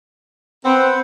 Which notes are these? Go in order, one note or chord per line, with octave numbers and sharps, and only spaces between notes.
C4 B4 C5 F#5